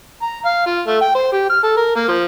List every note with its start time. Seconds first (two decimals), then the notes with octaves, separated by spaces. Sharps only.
0.22 A#5
0.45 F5
0.67 F4
0.87 A3
1.01 G5
1.15 C5
1.33 G4
1.49 F6
1.63 A4
1.77 A#4
1.96 A#3
2.08 F3